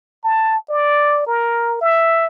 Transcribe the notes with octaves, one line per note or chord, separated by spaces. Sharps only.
A5
D5
A#4
E5